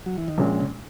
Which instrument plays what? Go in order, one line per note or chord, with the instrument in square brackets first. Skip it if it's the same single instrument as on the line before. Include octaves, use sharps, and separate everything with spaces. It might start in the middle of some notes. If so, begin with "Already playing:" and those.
[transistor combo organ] F#3
E3
D#3
[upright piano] A#1 A#2 G#3 C#4 [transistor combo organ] C#3
[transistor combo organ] C#3